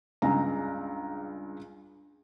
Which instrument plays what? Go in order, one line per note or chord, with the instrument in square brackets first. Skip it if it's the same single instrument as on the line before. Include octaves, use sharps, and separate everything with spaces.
[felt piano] C#2 G2 G#3 A#5